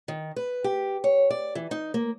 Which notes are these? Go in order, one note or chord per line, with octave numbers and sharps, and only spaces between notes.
D#3
B4
G4
C#5
D5
E3
D#4
A#3